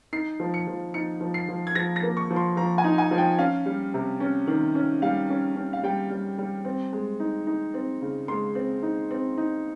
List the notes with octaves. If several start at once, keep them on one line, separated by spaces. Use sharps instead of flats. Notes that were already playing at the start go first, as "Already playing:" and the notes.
D#4 C7
F3
C#7
F3
D#4 C#7
F3
C7
F3
G#6
F3 A#6
A#6
A#3
C#6
F3
C6
F3 A#5
G#5
D#4
G#5
F3
G5
C#4 F5
G3
C3
C#4
D#3
C#4
G3 F5
C#4
C#4
F5
G3 G5
G3
G3
C4
G#3
D#4
D#4
C4
C#3
G#3 C6
C4
D#4
C4
D#4